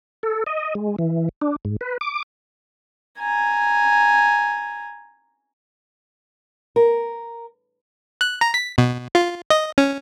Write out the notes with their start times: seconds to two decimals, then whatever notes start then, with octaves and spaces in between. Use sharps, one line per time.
0.23 A4
0.46 D#5
0.75 G#3
0.99 E3
1.42 D4
1.65 G#2
1.81 B4
2.01 D6
3.19 G#5 A#5
6.76 A#4
8.21 F#6
8.41 A#5
8.54 B6
8.78 B2
9.15 F4
9.50 D#5
9.78 C#4